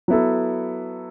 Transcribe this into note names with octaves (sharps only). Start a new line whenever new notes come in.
F#3 B3 E4 A4